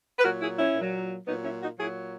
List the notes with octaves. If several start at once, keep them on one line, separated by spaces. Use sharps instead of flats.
B4
A#2 F#3 F#4 A#4
E4 G#4
C#4 E4
A#2 F#3
A#2 F#3 B3 D#4
C#4 E4
D#4 F#4
A#2 F#3 E4 G#4